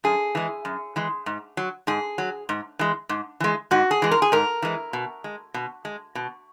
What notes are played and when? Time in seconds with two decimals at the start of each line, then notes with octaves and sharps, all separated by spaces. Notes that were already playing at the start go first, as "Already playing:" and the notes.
0.04 F#2 G#4
0.35 E3 G#3
0.65 F#2
0.96 E3 G#3
1.26 G#2
1.57 F#3
1.87 G#2 G#4
2.18 F#3
2.49 G#2
2.79 E3 G#3
3.09 G#2
3.40 E3 G#3
3.71 G#2 F#4
3.91 G#4
4.02 E3 G#3
4.12 A#4
4.22 G#4
4.32 G#2 A#4
4.62 E3 G#3
4.93 B2
5.24 G#3
5.54 B2
5.85 G#3
6.15 B2